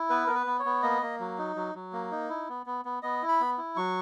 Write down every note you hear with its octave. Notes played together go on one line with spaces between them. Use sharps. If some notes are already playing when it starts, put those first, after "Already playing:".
Already playing: E4
B3 B4
B3 A#4
B4
B3
C#5
B3
A#3 D#5
A#3
F#3
D#4
F#3
F#3
A#3
D#4
E4
B3
B3
B3
B3 D#5
E4
B5
B3
E4
F#3 C#6